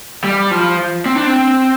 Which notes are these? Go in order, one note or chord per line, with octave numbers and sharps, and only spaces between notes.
G3
F3
C4
D4
C4